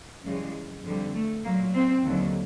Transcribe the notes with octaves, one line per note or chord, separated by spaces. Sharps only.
F#2 C#3 E3 G3 G#3
F2 D3 G3
A3
A#2 F#3 A#3
C4
D#2 D3 F#3